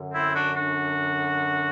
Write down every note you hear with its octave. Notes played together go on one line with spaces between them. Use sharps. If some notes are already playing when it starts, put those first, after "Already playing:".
Already playing: F#2 D3
C4 E4
D4 F#4
D4 F#4